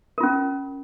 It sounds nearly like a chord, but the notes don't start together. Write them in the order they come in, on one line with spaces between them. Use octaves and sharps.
A#4 F4 C#4